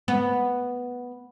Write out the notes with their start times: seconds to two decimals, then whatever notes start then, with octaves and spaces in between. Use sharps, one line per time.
0.08 B3